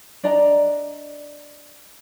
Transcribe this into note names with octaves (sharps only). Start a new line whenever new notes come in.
D4 D5 D#5 A#5